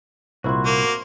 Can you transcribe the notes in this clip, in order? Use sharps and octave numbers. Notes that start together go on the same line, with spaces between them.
C2 A#2 E4 F#4 C5 C6
A#3